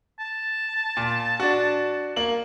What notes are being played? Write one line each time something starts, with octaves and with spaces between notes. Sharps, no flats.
A5
A#2
D4 F#4
A#3 F#7